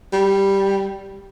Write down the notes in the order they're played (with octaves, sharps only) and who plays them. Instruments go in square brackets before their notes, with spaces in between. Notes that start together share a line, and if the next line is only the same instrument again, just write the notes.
[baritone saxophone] G3